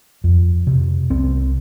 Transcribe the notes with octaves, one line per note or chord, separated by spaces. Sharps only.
F2
C3
C2 C4